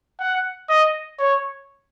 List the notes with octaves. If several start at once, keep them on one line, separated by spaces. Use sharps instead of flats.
F#5
D#5
C#5